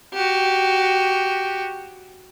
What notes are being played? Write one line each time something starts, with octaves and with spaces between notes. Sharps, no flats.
F#4 G4